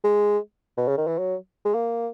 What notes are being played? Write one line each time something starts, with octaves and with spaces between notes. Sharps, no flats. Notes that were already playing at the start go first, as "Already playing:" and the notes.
G#3
B2
C#3
D#3
E3
F#3
G#3
A#3